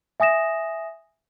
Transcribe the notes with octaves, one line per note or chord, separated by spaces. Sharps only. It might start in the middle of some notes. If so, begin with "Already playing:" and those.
E5 G#5 D#6 A#6 E7